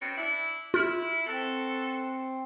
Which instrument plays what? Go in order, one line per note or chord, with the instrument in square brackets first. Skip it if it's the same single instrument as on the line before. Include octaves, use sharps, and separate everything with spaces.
[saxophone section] B2 C4 C#4
D4 E4
[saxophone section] E4 [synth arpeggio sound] F4 F6
[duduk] C4 [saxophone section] F#4 A4